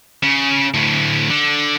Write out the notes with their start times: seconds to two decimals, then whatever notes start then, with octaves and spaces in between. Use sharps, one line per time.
0.23 C#3
0.74 D2 A2
1.29 D3